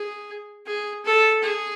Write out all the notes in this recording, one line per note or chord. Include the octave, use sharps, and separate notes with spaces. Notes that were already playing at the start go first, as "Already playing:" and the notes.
Already playing: G#4
G#4
A4
G#4